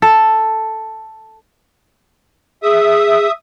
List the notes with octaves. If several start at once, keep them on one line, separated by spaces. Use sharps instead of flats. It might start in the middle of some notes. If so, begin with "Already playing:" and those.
A4
G#4 E5 D#6